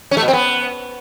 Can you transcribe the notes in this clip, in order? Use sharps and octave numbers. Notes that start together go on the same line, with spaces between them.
C#4
A3
B2
C4
B3